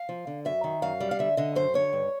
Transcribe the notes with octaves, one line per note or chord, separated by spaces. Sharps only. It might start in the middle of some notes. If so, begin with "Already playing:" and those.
Already playing: F5
F3
D3
F#2 E5
D#3
F#2 F5
G3
F5
D3 E5
D3 D#5
F#2 C5
D3 C#5
G2